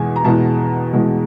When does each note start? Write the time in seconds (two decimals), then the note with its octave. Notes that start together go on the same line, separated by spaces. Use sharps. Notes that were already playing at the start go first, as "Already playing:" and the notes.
Already playing: E2 B2 G#3 G#5
0.16 A#5
0.24 E2 B2 G#3 A5
0.93 E2 B2 G#3